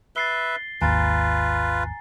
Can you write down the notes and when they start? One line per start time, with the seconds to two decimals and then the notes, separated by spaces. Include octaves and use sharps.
0.16 B4 E5 A6 C7 G7
0.82 G#1 D#2 F4 B4 G#5 A#5 A6